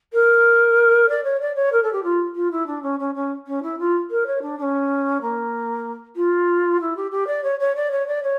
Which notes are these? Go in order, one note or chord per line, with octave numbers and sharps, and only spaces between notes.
A#4
D5
C#5
D5
C#5
A#4
A4
G4
F4
F4
E4
D4
C#4
C#4
C#4
C#4
E4
F4
A#4
C#5
D4
D4
C#4
A#3
F4
E4
G4
G4
D5
C#5
C#5
D5
C#5
D5
C#5